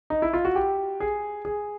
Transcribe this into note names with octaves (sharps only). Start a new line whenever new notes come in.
D#4
E4
F4
F#4
G4
G#4
G#4